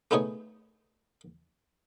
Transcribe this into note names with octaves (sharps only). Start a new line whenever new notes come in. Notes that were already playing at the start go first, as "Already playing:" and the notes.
A3 B3 D#4 G#4 C#5